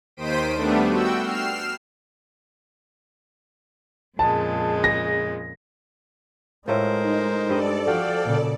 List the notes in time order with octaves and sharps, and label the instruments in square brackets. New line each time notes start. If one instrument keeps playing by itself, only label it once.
[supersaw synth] D#2 D#3 C5 B6 D7 D#7
G3 A3 B3 D4
F#4 G5 E6
F6 C7 E7
[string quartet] F2 A#2 C#3 [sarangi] G#3 [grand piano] A5
[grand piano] A#6
[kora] A2 A3 F4 [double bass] G#3 [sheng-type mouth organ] A#4 C5
[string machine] D#4
[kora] G2 C4 D#5 [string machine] A4 D5
[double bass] F3 [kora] F#4 [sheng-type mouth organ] F5 G5
[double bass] A#2 C#3